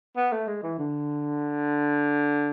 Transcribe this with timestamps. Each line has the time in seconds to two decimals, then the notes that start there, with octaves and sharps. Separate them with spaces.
0.17 B3
0.32 A3
0.47 G#3
0.63 E3
0.78 D3